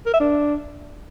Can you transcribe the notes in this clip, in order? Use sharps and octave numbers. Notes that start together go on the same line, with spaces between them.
A#4
E5
D4